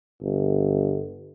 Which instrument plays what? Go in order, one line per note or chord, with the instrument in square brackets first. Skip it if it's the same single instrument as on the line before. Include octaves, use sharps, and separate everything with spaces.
[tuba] G1